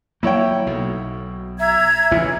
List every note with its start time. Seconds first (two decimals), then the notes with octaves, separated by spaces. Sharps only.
0.23 F#3 A#3 E4 C#5 G5
0.66 B1 B2
1.59 E5 A#5 G#6
2.11 A1 F2 C#3 E3